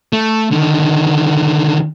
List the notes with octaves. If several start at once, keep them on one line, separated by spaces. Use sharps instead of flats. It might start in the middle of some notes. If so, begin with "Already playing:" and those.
A3
D3 D#3